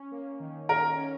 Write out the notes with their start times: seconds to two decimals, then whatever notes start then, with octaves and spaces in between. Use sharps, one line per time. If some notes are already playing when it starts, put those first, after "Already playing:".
Already playing: C#4
0.12 A#3
0.40 D#3
0.69 D#3 A#4
0.97 C#4